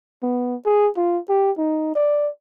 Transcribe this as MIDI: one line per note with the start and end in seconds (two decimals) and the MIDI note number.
0.23 0.55 59
0.66 0.89 68
0.97 1.19 65
1.29 1.51 67
1.58 1.92 63
1.95 2.29 74